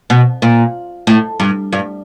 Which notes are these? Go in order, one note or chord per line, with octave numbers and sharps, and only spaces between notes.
B2
A#2
A2
G2
G2